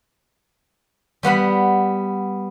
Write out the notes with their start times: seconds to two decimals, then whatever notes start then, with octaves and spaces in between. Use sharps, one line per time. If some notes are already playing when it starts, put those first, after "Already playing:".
1.23 G3 B3 F#5 B5